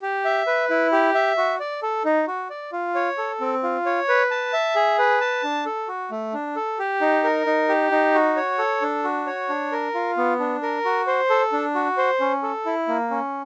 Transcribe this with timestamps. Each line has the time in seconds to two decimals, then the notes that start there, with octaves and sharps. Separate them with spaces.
0.02 G4
0.25 E5
0.47 B4
0.70 E4
0.92 G4
1.15 E5
1.38 F#4
1.60 D5
1.83 A4
2.05 D#4
2.28 F#4
2.50 D5
2.72 F4
2.95 C#5
3.18 A4
3.40 C4
3.63 F4
3.86 C#5
4.09 B4
4.31 A5
4.53 E5
4.76 G#4
4.99 B4
5.21 A5
5.44 D4
5.66 A4
5.88 F#4
6.11 A3
6.34 D4
6.56 A4
6.79 G4
7.01 D#4
7.24 A#4
7.46 D#4
7.69 G4
7.91 D#4
8.15 F#4
8.36 C#5
8.59 A4
8.82 D4
9.04 F#4
9.27 C#5
9.49 D4
9.72 A#4
9.95 F4
10.17 B3
10.40 D4
10.62 A#4
10.85 F#4
11.07 C5
11.30 A4
11.53 D4
11.75 F#4
11.97 C5
12.20 C#4
12.43 A4
12.66 E4
12.88 A#3
13.11 C#4